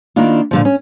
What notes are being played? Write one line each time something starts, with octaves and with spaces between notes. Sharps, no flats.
D#3 A#3 D4 E4 F4
A#2 D3 F3
C#4